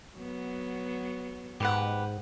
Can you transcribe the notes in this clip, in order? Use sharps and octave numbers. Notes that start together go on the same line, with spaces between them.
F#3 B3
G#2 G4 B4 F#5